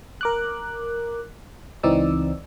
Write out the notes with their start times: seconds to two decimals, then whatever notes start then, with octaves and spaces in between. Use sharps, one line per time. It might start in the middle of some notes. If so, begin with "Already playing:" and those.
0.21 A#4 D6 F#6
1.83 C#2 E3 C4 D#4 D5 E6